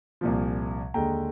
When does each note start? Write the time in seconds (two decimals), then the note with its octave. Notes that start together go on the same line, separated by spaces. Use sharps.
0.21 C2 A#2 F3
0.94 D#2 D3 G#3 G5 A#5